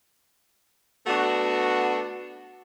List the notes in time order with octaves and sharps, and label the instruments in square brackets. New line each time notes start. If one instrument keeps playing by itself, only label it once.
[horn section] A3 B3 D4 F#4